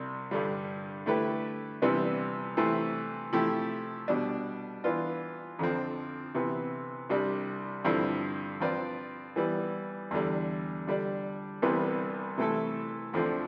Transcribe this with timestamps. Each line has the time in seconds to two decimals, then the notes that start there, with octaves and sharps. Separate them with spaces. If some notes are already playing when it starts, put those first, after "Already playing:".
Already playing: C2 C3 G3
0.31 G2 D3 G3
1.06 D3 A3 E4 G4 B4
1.82 C3 E3 G3 B3 D4
2.57 C3 E3 A3 C4
3.33 C3 F3 A3 E4 G4
4.08 B2 G3 D4
4.84 E3 B3 D4 F4
5.59 F2 D3 F3 C4
6.35 C3 E3 B3
7.10 C2 C3 G3 D4
7.85 G2 D3 F3 C4 E4
8.60 F3 C4 F4 B4 D5
9.36 E3 G3 B3
10.11 E2 D3 G3
10.87 D3 G3 D4
11.62 C2 C3 E3 G3 B3
12.38 C3 E3 A3 E4 A4
13.13 D2 D3 F3 A3 C4